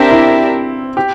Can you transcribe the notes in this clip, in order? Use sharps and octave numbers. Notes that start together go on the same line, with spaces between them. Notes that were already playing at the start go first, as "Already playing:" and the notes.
Already playing: C4 D4 G4 A#4 E5
E4
G4